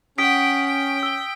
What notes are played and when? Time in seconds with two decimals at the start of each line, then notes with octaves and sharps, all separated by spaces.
0.18 C#4 F#5 G5 D#6 B6 D7
0.66 G5
1.03 E6 G7